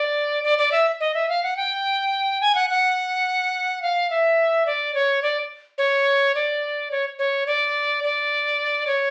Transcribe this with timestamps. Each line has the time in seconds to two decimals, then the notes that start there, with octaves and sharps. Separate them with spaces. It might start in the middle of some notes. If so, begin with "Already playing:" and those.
Already playing: D5
0.44 D5
0.58 D5
0.72 E5
1.00 D#5
1.14 E5
1.29 F5
1.43 F#5
1.57 G5
2.41 G#5
2.55 F#5
2.70 F#5
3.82 F5
4.10 E5
4.66 D5
4.95 C#5
5.23 D5
5.78 C#5
6.35 D5
6.91 C#5
7.19 C#5
7.47 D5
8.04 D5
8.87 C#5